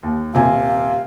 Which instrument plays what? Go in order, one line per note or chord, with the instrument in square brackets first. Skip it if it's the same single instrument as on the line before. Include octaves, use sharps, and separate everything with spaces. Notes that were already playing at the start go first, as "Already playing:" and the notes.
[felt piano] D#2
[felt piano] D#1 C3 G#5 [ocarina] F5